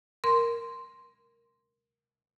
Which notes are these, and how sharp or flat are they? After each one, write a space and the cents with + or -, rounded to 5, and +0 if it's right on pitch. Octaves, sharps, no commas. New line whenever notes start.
A#4 +0 C6 +0